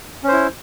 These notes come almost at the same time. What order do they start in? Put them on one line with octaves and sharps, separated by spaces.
C#4 C5 E4